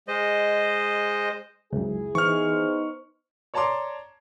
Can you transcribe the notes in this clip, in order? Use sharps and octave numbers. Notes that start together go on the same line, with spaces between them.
G#3 C5 D#5
C#2 F#2 E4 G#4
E3 B3 D#4 C5 C#6 F6
C#5 D5 A5 A#5 C6 D6